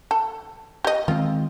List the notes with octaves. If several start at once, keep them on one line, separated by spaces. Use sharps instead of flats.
A4
G4 D#5
D#3 G#3 C4 F4